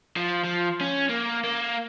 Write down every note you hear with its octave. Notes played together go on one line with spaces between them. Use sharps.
F3
F3
C#4
A#3
A#3